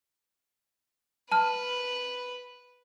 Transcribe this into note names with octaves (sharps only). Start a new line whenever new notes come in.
B4 A5 F6